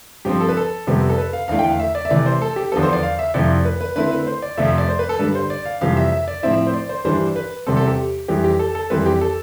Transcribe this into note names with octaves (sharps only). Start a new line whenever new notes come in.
G2 F3 C4 G4
A4
B4
A4
F2 C3 G3 B3
A4
B4
F5
E2 D3 A3 E4 F5
G5
F5
E5
D5
E5
C3 E3 A3 D5
C5
A4
G4
E2 D3 F3 B3 A4
C5
D5
F5
E5
F2 C3 F3 A3 E4 D5
B4
B4
D3 A3 C4 E4 B4
B4
C5
D5
F2 C3 F3 A3 E5
E5
D5
C5
B4
A4
G2 D3 G3 B4
C5
D5
F5
F2 C3 E3 G3 F5
E5
E5
D5
A2 F3 C4 E4 E5
E5
C5
D5
C5
G2 E3 G3 D4 C5
B4
E2 C3 G3 C4 A4
A4
G4
F2 E3 G3 G4
G4
A4
A4
F2 E3 G3 C4 B4
G4
A4